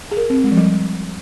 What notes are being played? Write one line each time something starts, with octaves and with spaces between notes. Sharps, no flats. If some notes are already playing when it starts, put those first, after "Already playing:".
G#4
A#4
C4
G#3
F3
G3